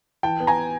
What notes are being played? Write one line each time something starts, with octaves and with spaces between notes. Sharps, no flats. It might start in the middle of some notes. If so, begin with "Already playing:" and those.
E3 G5 A5
B3
G#5 A#5